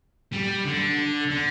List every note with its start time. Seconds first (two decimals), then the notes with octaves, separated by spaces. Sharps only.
0.32 G3
0.65 D3
1.30 D3